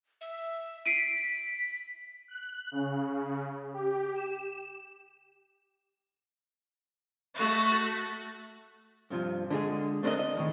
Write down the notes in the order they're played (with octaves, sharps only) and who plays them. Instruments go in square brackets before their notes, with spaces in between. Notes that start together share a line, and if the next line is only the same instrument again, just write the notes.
[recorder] E5
[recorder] B6 [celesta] C7 D7 D#7
[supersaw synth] F#6
C#3
G4
E7
[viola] A3 F#4
[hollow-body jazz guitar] G2 C3 F3
D3 G#3 G#4
A3 C4 D4 A#4 D#5
D#5
E2 A2 D#3